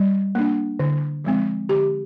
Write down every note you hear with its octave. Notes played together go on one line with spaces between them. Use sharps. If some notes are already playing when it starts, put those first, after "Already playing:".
Already playing: G3
A#3 D4
D3
F3 G#3 C4
D3 G4